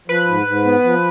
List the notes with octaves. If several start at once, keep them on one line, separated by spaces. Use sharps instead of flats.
F3 B4
G#2
G#2
B3
F3